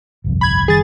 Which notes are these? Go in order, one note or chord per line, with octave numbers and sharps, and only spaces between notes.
G1 C2 F2
B5 G#6
F#1 D#3 G3 G#4 A6